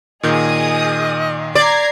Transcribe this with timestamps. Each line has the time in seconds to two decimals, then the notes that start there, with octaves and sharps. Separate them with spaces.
0.23 A#2 D#3 G#4 D#5 D#6 G6
1.55 D5 A#5 G#6 C7